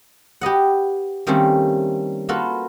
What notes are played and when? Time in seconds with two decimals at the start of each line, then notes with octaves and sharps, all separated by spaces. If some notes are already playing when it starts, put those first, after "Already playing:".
0.41 G4 B4 D#5 F#5
1.27 D#3 G3 A3 A#3 C4 C#4
2.29 A#3 F4 F#4 A4 B4